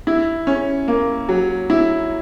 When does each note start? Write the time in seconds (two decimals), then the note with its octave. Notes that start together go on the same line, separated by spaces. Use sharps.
0.07 E4
0.47 C#4
0.88 A#3
1.29 F#3
1.70 E4